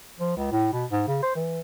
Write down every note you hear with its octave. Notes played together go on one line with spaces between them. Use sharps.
F3
C#2
A2
B2
G#2
C#3
C5
E3